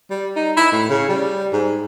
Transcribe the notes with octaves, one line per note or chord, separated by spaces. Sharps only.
G3
D#4
E4
A2
C#3
G3
G#2